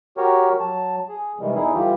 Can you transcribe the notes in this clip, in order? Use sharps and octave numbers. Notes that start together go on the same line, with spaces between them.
F#4 G4 A#4 C#5
F#3 A5
G#4
C3 D#3 E3 G3 G#3
E2 D#4 E4 G#4
D3 E3 G3 F4 G4